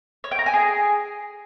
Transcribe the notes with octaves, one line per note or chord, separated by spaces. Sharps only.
C#5
G5
A#5
G#5
G#4